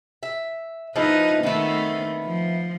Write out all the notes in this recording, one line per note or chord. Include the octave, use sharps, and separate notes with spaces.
E5
F3 D#4 E4 B4 D#5
D#3 A3 B3 C4 E4
F3